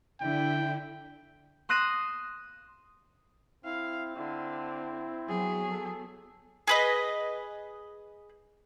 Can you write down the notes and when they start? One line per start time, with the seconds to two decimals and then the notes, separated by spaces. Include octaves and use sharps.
0.20 D3 E4 G5
1.69 C6 D#6 F#6 A#6 D#7 E7
3.65 C4 E4 F5
4.16 D3 E4
5.29 F#3 B3 G#4
5.70 A4
6.67 G#4 B4 D#5